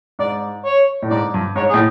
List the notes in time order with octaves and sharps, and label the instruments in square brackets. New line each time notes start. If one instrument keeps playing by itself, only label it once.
[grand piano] G#2 [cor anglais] D5
[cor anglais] C#5
[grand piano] A2
[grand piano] G#2 [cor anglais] D5
[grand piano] G2
[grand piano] G#2 [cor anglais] C#5
[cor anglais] G#4
[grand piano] A2